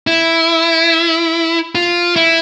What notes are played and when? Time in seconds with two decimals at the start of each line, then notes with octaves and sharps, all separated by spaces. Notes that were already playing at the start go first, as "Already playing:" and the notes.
0.07 E4
1.75 F4
2.16 E4